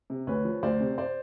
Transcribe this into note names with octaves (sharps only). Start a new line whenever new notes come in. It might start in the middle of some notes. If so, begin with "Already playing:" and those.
C3
D2 B4 C#5
F3
D2 C5 D5
C3
C5 D5